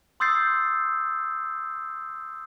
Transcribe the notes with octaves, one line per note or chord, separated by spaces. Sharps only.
C6 D#6 E6 G6 A6 C7